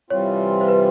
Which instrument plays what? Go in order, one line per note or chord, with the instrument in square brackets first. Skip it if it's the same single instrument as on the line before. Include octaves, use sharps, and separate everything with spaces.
[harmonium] C3 E3 G3 C4 F4 [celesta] C#5
[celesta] C5
B4